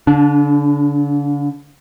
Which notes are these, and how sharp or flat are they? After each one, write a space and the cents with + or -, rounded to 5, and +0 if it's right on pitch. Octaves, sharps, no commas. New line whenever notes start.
D3 -40 D4 +0